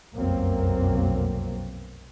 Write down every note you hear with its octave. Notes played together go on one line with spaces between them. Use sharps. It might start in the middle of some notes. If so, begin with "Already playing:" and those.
F1 B1 F#2 F#3 A#3 C4